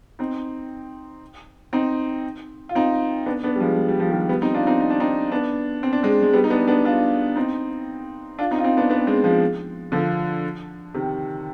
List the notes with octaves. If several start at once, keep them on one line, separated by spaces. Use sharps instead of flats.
C4 D#4
C4 D#4
F4
C4 D#4
B3 D4
B3 D4
G3
F3 G#3
G#3
G3
F3
D#3 G3
G3 B3
C4 D#4
D4 F4
C4 D#4
D#4
D4
C4 D#4
B3 D4
C4
D4
G#3 C4
G#3
G3 B3
D#4
B3 D4
B3 D4
D4 F4
C4 D#4
D4 F4
C4 D#4
F4
C4 D#4
B3 D4
B3 D4
G#3 C4
F3 G#3
D3 F3
C3 D#3